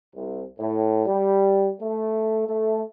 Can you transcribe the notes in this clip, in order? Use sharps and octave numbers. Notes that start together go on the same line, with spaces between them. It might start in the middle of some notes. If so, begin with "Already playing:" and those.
C2
A2
G3
A3
A3